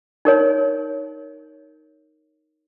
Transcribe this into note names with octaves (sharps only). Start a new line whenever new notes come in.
D#4 A#4 C#5